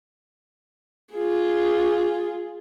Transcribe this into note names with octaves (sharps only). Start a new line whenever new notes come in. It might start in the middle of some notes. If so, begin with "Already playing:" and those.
F4 G#4